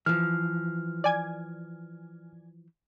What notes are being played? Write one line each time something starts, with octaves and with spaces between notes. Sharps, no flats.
E3 F3 F6
D5 G#5 G#6